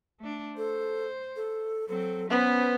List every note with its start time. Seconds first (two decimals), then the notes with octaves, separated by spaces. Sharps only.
0.20 A3 D4
0.57 A4 C5
1.36 A4
1.88 F#3 C4 A4
2.30 B3 C#4 B4 C5